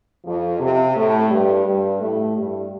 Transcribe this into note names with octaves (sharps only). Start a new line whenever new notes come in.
F2 F3
C3
A2 A3
G2 G3
G2 G3
A2 A3
G2 G3